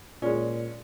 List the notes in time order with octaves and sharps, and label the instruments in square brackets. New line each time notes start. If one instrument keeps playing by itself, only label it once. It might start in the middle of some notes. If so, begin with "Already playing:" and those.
[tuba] A#2 [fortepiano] G#3 C#4 [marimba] F4 D5